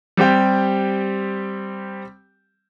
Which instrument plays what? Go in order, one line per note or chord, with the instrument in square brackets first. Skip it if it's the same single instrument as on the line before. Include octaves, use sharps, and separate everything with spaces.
[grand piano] G3 C4 G4 G5